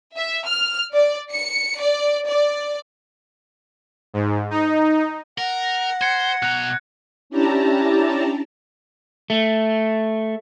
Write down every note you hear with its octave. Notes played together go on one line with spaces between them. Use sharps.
E5
F6
D5
C#7
D5
D5
G#2
D#4
A#4 F#5 A#6
C5 G#6 C#7
B2 A#5 F#6
C#4 D4 E4 G4 A5 A#5
A3